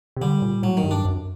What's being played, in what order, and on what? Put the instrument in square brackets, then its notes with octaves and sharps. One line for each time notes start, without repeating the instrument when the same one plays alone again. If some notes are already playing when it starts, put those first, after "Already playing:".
[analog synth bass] C3
[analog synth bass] D3 [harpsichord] G3
[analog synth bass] A#2
[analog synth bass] A2 [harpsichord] F#3
[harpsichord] D#3
[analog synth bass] G2
[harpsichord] D4
[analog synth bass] F#2